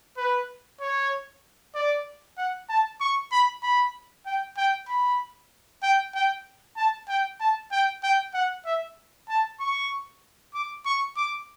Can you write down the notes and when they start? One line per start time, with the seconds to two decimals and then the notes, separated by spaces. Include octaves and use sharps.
0.17 B4
0.80 C#5
1.75 D5
2.38 F#5
2.69 A5
3.01 C#6
3.31 B5
3.63 B5
4.26 G5
4.57 G5
4.88 B5
5.83 G5
6.14 G5
6.77 A5
7.08 G5
7.40 A5
7.72 G5
8.03 G5
8.34 F#5
8.66 E5
9.29 A5
9.60 C#6
10.54 D6
10.85 C#6
11.16 D6